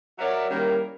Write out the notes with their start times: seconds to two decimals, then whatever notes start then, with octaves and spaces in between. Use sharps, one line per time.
0.19 F#3 F#4 A#4 C#5 D5 E5
0.49 D#3 G3 A#3 C#4 E4 A#4